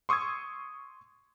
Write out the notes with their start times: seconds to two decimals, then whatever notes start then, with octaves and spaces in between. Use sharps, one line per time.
0.09 C6 C#6 D#6 E6 G#6